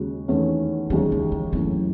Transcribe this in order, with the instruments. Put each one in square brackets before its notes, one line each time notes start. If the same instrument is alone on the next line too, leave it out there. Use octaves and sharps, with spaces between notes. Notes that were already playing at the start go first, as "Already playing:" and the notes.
Already playing: [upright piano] D#2 C#3 G#3 F#4
E2 D#3 A3 C#4
[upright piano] D#2 C#3 G#3 [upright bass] F#3
[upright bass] E3
E3
[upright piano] F#2 E3 A3 [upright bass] F#3